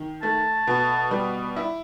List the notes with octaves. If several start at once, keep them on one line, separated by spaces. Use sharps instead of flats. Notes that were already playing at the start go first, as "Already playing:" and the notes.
Already playing: D#3
A3 A5
B2
G3
E4